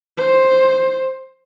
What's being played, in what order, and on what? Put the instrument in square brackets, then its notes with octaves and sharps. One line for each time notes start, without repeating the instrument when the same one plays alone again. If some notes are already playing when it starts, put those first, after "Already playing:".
[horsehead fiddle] C5